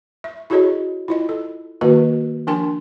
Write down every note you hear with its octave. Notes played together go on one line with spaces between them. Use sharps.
E5
E4 F#4 G#4 A4 C#5 D#5
E4 F4 D#5
A4
D#3 A#3 F#4 A#4 B4 D#5
F3 D4 A#4 G5 A5 C6